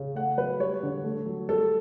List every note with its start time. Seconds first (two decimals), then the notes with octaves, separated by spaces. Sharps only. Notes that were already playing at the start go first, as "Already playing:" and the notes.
Already playing: C#3
0.15 A3 F#5
0.37 F#3 B4
0.60 G3 C#5
0.83 D3
1.04 A3
1.26 F#3
1.49 G3 A4